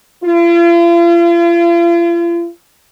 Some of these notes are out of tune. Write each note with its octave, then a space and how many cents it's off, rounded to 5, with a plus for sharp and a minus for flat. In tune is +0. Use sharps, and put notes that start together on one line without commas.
F4 -40